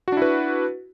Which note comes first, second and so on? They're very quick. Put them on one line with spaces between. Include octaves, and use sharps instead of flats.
F#4 D4 E4 B4